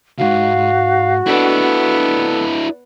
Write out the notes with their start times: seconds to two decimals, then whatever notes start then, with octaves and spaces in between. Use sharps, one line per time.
0.18 B1 G#2 F#4 F5
1.26 B3 D4 E4 A4